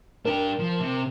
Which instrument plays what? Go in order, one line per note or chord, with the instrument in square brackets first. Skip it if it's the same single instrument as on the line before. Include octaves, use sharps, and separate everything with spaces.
[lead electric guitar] D4 G4 [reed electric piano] A#4
[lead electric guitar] F3
C3